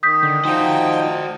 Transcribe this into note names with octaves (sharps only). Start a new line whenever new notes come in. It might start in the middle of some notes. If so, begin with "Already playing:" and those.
D#3 D#6 G6 B6
D3
F3 D#4 F#4 C5 G5